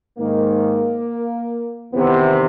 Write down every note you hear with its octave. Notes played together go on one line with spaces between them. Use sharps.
G#2 D#3 A#3
E2 C3 D#3 B3